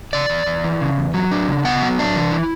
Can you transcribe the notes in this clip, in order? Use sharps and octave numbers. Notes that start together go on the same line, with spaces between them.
C#3 D5
E2
E2
E3
C#3
E2
F#3
D4
C#3
B3 F#5
F#3
D4
E3
E4